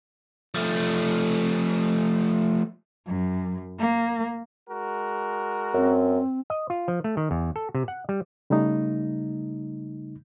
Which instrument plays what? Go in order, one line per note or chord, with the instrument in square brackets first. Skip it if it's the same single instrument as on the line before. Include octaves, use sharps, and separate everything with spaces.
[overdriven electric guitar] F3 A3
[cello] F#2
A#3
[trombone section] G#3 F#4 A#4
[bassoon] F#2 [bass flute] C4
[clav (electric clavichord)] D#5
F4
F3
A3
D#3
E2
A4
C3
F#5
G3
[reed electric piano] C#3 G3 A3 D#4